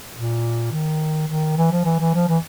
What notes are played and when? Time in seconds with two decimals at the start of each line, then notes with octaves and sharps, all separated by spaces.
0.15 A#2
0.72 D#3
1.28 D#3
1.57 E3
1.72 F3
1.85 E3
2.00 E3
2.14 F3
2.28 E3